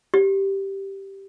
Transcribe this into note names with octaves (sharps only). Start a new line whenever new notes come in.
G4